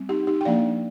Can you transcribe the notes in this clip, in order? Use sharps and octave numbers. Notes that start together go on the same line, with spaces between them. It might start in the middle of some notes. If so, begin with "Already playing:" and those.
Already playing: G3 C4
D#4 G4
D#4 G4
G5
F3 A#3 D4 D5 F5